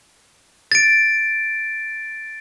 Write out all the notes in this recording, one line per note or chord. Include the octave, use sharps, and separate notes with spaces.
A6 D7